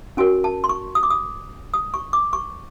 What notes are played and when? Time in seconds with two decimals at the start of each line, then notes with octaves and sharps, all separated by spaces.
0.17 C#4 F#4 A#4 C#5 G#5
0.44 A5
0.64 C6
0.69 C#6
0.95 D#6
1.03 D6
1.10 D#6
1.74 D#6
1.94 C#6
2.13 D6
2.33 C#6